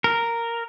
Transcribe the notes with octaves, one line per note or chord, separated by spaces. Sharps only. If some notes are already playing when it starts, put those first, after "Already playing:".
A#4